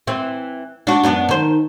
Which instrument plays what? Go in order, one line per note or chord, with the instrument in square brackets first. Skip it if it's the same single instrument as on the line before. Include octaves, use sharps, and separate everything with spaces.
[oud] E3 C4
D4 F#4
F#2 B3 D4
D#3 C5